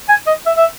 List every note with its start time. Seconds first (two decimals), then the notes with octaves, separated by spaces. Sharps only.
0.09 G#5
0.27 D#5
0.46 E5
0.57 E5